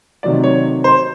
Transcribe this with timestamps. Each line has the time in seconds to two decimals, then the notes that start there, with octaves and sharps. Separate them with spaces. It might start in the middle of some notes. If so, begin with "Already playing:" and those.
0.23 C3 D#3 F#3 A3 D5
0.44 C#5
0.84 C5